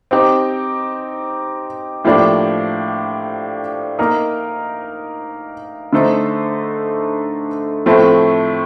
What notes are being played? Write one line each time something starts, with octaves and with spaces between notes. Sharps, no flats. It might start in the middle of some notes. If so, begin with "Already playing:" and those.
C4 D#4 G4
A2 F3 A#3 D4 G4
A#3 D#4 A#4 D#5
D3 A3 D#4 A4 C5
A2 F3 A3 C4